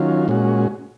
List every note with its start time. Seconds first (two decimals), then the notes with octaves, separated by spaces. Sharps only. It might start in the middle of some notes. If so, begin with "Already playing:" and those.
Already playing: D#3 F#3 C#4 F4
0.28 A#2 G#3 C#4 F#4